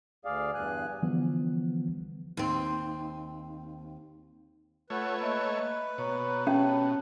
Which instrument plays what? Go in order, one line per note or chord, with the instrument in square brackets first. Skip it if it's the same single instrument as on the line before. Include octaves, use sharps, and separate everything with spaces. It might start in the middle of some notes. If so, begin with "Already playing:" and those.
[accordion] D2 G#4 D5 F5
E2 G2 G#5 F#6
[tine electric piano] D3 E3 F3 G3 B3
[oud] D#2 C4
[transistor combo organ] A3 C#5 [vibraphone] F4 F#5 [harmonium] B4
[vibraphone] A#3 D#5 E5
[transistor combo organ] B2 [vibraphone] C#5 A#5 C#6
[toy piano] C#4 [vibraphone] G4 C#5 A5